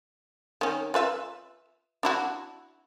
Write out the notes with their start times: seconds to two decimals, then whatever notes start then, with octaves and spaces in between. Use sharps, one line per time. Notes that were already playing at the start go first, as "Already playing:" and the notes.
0.61 D#3 C#4
0.94 F4 B4 E5
2.03 D4 E4 F#4